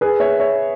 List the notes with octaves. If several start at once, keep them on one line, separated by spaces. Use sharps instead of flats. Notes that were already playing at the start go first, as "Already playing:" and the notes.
G#4 B4
C#5 E5
C#5 E5